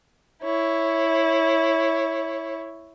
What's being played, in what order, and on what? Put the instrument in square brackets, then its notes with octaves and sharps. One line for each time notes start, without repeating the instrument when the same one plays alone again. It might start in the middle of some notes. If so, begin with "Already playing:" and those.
[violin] E4 C#5